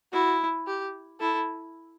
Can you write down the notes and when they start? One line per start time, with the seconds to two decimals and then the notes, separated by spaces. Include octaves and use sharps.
0.13 E4 F#4
0.67 G4
1.20 E4 A4